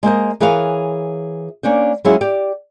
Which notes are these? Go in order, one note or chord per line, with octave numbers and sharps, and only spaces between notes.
G#3 A#3 C5 D#5
E3 G#4 A#4 B4 C#5 F5
A#3 C#4 D4 C5
F#3 G#3 C#4 E4 F4 G#4
G4 D5